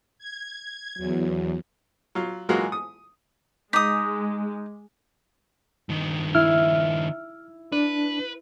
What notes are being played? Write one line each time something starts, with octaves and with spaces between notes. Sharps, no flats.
G#6
E2 F#3
F#3 F4
E3 F#3 G#3 A#3 F4 F#4
D#6
G#3 D#4 D6 D#6 B6
G2 D#3
E4 F6
D4 B4